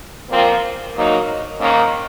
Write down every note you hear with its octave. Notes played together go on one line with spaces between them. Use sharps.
A#2 F3 A#3 C4
G#2 F#3 A#3 D#4
G#2 D#3 A#3 C#4